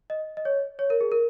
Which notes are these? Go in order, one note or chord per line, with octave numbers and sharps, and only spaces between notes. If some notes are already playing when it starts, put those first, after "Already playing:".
D#5
D#5
C#5
C#5
A#4
G#4
A#4